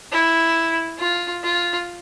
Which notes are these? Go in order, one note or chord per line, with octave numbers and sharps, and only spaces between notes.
E4
F4
F4